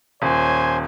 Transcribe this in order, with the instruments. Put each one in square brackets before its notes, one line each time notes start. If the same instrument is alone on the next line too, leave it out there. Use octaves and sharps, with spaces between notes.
[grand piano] D#1 [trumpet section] C5 C#5 G#5